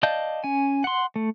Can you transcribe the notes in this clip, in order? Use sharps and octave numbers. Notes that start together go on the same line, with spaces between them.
D5 D#5 F5 A5 G6
C#4 G#5
F#5 C6
A3